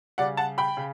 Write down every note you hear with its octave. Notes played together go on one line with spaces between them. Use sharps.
C#3 G3 D5 F#5
F#5 A5
G5 B5
C#3